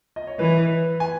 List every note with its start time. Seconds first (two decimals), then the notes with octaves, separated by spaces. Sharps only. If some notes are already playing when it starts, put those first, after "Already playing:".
0.16 D#5
0.27 C#5
0.39 E3 B4
1.00 G#5